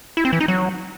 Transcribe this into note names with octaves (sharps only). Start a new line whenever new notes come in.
E4
C4
E3
D#4
F#3